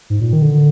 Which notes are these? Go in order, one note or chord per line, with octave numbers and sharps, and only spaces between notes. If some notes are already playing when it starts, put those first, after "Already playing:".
G#2
A#2
D#3
D3